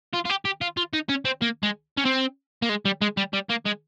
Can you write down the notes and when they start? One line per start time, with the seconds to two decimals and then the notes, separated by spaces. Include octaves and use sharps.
0.13 F4
0.25 F4
0.30 G4
0.45 G4
0.61 F4
0.77 F4
0.94 D#4
1.09 C#4
1.25 C4
1.42 A#3
1.63 G#3
1.98 C#4
2.05 C4
2.62 A#3
2.69 G#3
2.85 G3
3.02 G#3
3.17 G3
3.33 G3
3.49 A#3
3.65 G#3